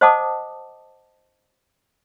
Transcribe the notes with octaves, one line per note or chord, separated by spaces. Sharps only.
C5 D#5 F#5 A5 D6 D#6